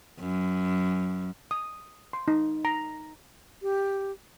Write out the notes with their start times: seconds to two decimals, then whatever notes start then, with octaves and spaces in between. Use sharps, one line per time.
0.20 F#2
1.51 D#6
2.13 C6
2.28 D#4
2.65 A#5
3.62 G4